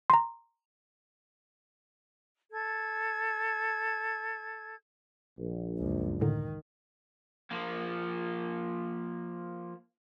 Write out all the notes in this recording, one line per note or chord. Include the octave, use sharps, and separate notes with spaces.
A#5 C6
A4 G#6
A#1
C#2 F#2
A2 D3 D#3
F3 A#3